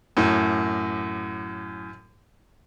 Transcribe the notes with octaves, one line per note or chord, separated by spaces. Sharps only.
F#2 A2